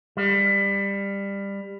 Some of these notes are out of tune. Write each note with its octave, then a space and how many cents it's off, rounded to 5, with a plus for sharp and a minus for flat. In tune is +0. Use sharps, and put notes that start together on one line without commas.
G3 +20